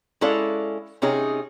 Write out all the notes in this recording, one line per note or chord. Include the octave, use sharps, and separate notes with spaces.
G#3 C#4 E4 A4 D5 F5
C3 C#4 D#4 G#4